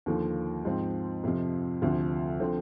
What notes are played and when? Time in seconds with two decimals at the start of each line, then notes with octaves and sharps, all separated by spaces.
0.06 D#2 D3 F3
0.65 G#2 F3 C4
1.23 F2 C3 F3
1.82 D2 C3 F3
2.40 D3 F3 C4